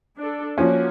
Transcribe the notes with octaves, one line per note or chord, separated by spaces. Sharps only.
D4 A4
F3 A#3 C#4 F#4